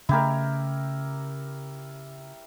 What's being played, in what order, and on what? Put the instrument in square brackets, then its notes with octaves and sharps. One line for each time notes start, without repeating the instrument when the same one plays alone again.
[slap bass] C#3 A3 [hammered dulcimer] E4 G4 A#4